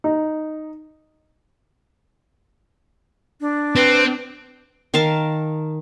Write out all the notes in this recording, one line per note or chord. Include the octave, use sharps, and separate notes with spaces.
D#4
D4
C4 B4
D#3 A#4 F5 A5